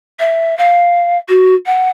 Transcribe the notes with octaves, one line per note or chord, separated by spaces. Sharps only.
E5
F5
F#4
F#5